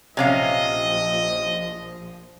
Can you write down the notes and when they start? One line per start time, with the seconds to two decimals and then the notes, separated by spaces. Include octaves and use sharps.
0.17 A#1 C3 F3 C#4 D#5 F5